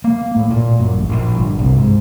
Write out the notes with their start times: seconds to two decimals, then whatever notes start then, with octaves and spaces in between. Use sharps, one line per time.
0.04 A#3
0.36 A2
0.50 A#2
0.79 F#2
0.94 A1
1.10 A#1
1.35 G1
1.59 C2
1.77 G#2